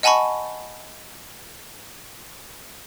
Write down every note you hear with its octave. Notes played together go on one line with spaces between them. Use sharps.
D#5 F#5 G#5 A5 B5 C#6